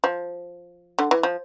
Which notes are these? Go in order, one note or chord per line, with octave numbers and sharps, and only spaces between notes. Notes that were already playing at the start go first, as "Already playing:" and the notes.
F3
D3
E3
F3